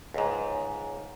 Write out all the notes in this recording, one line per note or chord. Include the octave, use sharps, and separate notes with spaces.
C#2 G#2